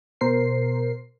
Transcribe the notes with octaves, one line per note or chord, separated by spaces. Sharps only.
B2 A#4 C5 C7